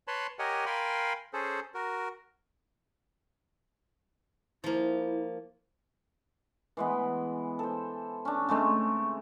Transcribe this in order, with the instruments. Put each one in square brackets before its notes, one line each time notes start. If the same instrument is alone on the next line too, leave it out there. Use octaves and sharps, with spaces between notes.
[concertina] B4 C#5 A5 B5 C6
G4 A#4 C#5 D#5 F#5 G#5
A#4 F5 G5 G#5 B5 C6
C#4 G#4 A4 C5
F#4 A#4
[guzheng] F3 A#3 [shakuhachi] E4
[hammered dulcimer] E3 G#3 B3
A4 C5
C#4 D4
C#3 G#3 A3 C4